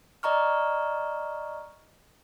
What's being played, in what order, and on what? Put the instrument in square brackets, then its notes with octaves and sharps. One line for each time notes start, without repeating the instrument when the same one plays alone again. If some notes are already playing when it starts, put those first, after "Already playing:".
[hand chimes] D5 D#5 A#5 C#6 F6